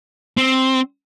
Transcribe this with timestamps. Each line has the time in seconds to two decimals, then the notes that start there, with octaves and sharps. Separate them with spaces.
0.37 C4